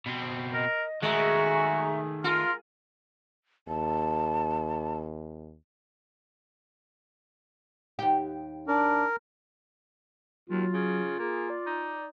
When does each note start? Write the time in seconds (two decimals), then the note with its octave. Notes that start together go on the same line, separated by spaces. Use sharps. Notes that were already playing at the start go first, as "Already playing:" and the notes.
0.06 B2 C4
0.53 A#4 D#5
1.02 D#3 G#3 A3 F#4 E5 A#5 C#6
2.24 F4 A#4 C6 F6
3.68 D#2 A5
7.99 D#2 G4
8.68 D4 A#4
10.50 D#2 F#3 F4
10.74 C#3
11.19 A#3 G#4
11.50 D5
11.66 D#4